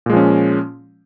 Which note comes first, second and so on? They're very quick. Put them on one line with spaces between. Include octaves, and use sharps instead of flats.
A#2 G#3 F3 C#4